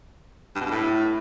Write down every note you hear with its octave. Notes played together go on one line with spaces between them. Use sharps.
G2
B2
G2
A2